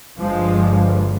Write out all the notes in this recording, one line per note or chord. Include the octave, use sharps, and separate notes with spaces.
G1 G2 F3 G#3